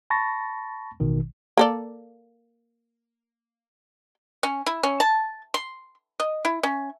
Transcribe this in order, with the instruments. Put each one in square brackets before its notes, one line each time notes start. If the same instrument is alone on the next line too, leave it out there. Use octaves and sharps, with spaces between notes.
[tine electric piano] A5 B5 C#6 A6 A#6
A1 B2 D#3
[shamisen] A#3 A4 D5
[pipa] C#4
E4
C#4
A5
C6
D#5
E4
C#4